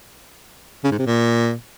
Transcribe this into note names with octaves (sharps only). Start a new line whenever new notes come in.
C#3
G#2
C3
A#2